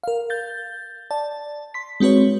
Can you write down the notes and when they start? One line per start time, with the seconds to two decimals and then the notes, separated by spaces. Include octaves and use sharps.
0.04 A#4 F5
0.30 G6 A6
1.11 D5 A5
1.74 C6 B6
2.00 G#3 C4 F#4 B4 C#5